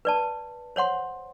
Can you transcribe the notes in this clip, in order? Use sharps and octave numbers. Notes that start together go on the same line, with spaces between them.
B4 D5 A5
C5 C#5 F#5 C6